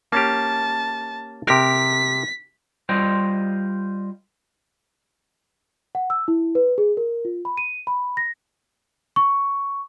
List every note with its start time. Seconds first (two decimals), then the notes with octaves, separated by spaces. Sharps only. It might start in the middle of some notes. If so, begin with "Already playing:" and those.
0.12 A#3 C#4 G4 A5
1.47 C3 G4 A#4 B6
2.89 G3 F4 C5 D#5 G5
5.95 F#5
6.10 E6
6.28 E4
6.55 B4
6.78 G#4
6.97 A#4
7.25 F4
7.45 B5
7.57 D#7
7.87 B5
8.17 A#6
9.16 C#6